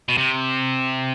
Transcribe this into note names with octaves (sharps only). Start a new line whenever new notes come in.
B2
C3